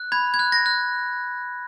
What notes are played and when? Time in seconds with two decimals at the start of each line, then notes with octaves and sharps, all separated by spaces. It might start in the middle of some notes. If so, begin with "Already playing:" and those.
Already playing: F#6
0.12 B5 G#6
0.34 G#6
0.39 F#6
0.52 A#6
0.66 F#6